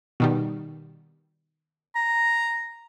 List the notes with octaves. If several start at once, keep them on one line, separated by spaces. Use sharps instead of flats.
B2 D#3 G3
A#5